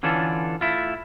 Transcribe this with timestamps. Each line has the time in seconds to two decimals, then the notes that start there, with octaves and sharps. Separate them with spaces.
0.03 D3 E3 C#4 D4 F4 A4
0.61 A3 E4 F4